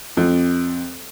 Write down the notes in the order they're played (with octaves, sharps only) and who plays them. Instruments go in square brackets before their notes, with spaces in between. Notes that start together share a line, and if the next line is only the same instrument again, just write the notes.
[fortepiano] F2